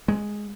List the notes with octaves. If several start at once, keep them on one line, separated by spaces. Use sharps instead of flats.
G#3